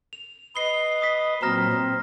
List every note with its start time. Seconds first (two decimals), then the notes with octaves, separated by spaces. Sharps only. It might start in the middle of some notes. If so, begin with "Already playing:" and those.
0.13 F7
0.56 B4 D#5 C7 G7
1.02 D#6 B6
1.42 A#2 F#3 C4 A#5 F6 A#6
1.72 C4